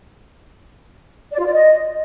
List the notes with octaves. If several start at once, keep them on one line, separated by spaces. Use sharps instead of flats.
D5
F4
D5
D#5